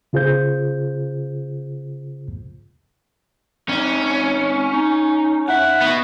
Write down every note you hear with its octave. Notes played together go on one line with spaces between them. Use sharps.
C#3 F4 G#4 C5 G6
C4 C#4 D#4 D5
D#4
D#4 E5 F#5
B3 F#4